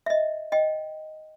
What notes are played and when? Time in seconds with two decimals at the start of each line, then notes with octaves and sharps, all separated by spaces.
0.06 D#5 E5
0.52 D#5 G5